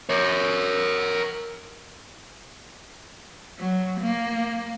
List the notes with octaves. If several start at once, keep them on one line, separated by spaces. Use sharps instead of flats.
A#4 C#5
F#3
A#3